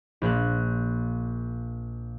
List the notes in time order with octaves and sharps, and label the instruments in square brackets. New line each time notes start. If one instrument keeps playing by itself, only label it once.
[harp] A#1 A#2 F#6